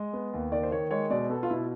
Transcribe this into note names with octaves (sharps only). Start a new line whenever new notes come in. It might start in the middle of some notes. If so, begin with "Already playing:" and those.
Already playing: G#3 D#5
B3
D#2
D#3 D5
C5
D#3 C#5
G#3 C#5
B2 D5
B3 A4
F4
B2 E4